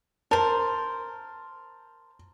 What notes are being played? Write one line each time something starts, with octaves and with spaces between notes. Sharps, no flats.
A#4 C5 A5